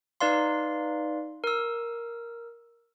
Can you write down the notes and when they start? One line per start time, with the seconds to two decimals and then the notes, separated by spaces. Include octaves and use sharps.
0.20 D#4 B4 D5 F5 C6
1.44 A#4 E6